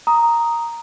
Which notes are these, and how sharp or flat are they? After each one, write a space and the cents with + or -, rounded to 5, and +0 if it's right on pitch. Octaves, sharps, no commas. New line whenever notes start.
A#5 +0 D#6 +0